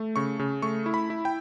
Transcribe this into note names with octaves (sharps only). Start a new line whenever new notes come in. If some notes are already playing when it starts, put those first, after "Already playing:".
Already playing: A3
C#3 C#6
C#3
A3 C#6
E4
B5
E4
G5